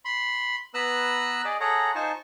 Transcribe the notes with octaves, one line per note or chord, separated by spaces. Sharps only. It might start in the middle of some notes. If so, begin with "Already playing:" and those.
B5 C6
B3 B4 A#5 E6 F#6
G#4 D5 D#5
G#4 A4 C#5 F#5 A#5
D#4 F4 C5 G#5 A5 C#6